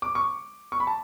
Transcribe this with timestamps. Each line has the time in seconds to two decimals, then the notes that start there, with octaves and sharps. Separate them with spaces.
0.02 D6
0.15 C#6
0.72 C#6
0.80 B5
0.87 A5